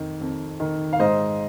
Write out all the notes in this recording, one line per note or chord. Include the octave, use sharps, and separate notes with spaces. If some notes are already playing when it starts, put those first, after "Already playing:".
Already playing: F2 D#3
F2
D#3
F5
G#2 C5 D#5